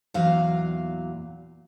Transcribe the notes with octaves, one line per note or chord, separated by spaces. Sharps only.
E2 A#2 F#3 F5